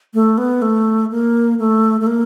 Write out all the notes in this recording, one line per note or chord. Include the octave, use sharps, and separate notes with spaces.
A3
B3
A3
A#3
A3
A3
A#3